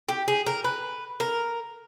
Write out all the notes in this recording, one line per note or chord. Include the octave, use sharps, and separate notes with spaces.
G4
G#4
A#4
B4
A#4